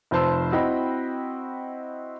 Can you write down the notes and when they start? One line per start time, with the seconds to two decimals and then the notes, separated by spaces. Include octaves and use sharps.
0.11 F1 F3 C5 A5 C6 E6
0.51 C4 E4 F#4 D#5 G5 B5